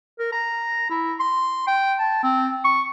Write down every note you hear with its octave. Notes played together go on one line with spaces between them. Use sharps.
A#4
A#5
E4
C6
G5
A5
C4
C#6